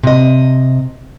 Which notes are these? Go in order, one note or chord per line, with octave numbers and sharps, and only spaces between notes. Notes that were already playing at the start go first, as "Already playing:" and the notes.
C3 D#5